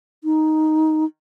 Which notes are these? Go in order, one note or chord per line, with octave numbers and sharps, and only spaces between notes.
D#4